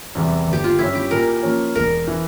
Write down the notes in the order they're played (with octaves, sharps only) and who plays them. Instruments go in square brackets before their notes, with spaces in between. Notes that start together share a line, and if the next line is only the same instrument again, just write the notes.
[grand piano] E2 C3 G3
G1
[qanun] G4
F4
[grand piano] G2 G3 C#4 [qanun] E4
[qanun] G4
[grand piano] A#2 [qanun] A#4
[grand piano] F3 A#3 C#4
[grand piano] E1 [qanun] A#4
[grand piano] E3